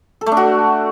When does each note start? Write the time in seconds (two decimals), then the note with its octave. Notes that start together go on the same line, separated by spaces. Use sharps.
0.21 A4
0.26 A3
0.32 D4
0.37 F#4